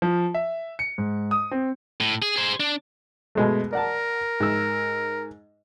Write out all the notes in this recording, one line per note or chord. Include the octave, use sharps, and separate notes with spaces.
F3
E5
C#7
G#2
D#6
C4
A2
G#4
G#4 C5
D4
B2 G#3 A3
A#4 D5 F#5 A5
G#2 E6